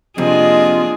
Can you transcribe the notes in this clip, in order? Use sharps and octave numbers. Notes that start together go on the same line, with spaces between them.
F2 C3 A#3 D4 F4 G#4 D#5